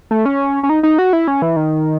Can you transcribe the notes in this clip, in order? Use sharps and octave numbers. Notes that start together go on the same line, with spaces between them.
A3
C#4
C#4
D#4
D#4
F#4
E4
C#4
E3
D#3